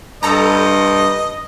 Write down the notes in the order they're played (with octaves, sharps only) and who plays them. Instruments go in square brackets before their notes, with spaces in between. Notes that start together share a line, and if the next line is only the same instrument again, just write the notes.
[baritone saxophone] G2 [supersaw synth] A4 A#5 [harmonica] D#5